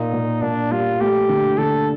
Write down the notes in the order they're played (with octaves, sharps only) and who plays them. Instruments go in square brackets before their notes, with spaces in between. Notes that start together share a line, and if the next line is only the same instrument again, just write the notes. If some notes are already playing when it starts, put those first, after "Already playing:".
Already playing: [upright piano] A#2 [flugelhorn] D#4
[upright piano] A#2
[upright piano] A#2 [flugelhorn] D4
[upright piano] G3 [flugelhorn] F4
[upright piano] A3 [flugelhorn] G4
[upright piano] D3
[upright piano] D3 [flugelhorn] A4